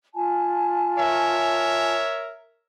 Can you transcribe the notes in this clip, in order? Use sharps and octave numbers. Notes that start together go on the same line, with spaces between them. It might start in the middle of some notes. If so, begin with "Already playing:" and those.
F4 G#5 A5
A#4 C#5 E5